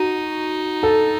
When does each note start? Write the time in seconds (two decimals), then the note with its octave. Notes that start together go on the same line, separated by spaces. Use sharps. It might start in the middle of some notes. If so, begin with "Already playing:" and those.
Already playing: D#4 F#4
0.83 A4